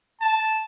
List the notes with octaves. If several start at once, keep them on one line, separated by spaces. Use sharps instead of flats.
A5